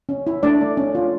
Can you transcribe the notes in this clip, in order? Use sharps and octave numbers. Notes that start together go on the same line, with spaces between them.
C#4
E4
A3 D4 D5
A3
C#4
F4